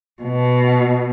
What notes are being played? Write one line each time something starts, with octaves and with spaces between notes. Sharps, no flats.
B2